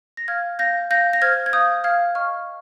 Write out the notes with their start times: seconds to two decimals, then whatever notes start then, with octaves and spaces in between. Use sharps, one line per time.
0.17 A#6
0.28 F5 F6 G#6
0.59 F5 G6 A#6
0.90 F5 G6 A#6
1.13 A#6
1.22 C5 F6 G#6
1.46 G#6
1.53 F5 D#6 G6
1.84 F5 F6 G#6
2.15 D#5 C#6 F6